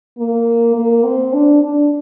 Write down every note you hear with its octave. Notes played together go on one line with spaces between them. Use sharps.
A#3
A#3
C4
D4
D4